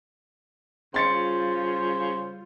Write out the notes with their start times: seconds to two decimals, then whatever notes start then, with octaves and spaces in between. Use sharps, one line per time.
0.94 C#3 G3 F4 C5 C6 A6 C#7